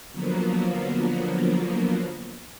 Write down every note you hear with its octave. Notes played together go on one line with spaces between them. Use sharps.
D3 F3 F#3 A#3 B3